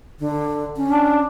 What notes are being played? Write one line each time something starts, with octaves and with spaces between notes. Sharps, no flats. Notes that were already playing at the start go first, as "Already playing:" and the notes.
D3
C#4
D4